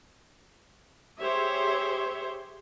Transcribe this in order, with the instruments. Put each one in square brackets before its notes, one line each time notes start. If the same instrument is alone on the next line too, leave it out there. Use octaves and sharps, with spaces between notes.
[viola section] G4 G#4 C5 C#5 E5